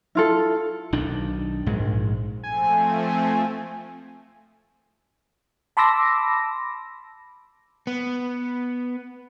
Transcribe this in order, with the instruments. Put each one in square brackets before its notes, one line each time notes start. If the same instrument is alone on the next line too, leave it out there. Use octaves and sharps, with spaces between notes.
[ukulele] E4 F4 A4
[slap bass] B1 D#3 D4
A#1 G#2 G#3
[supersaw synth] F3 A3 C4 [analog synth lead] G#5
[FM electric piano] A5 B5 C6 D6 E6 A#6
[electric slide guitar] B3